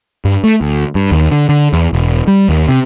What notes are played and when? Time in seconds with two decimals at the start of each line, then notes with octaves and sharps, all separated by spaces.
0.25 G2
0.44 A3
0.61 D2
0.95 G2
1.11 D#2
1.31 D3
1.49 D3
1.73 E2
1.93 E1
2.28 G3
2.49 D#2
2.69 C3